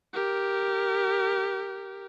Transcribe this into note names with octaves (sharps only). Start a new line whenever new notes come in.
G4 A#4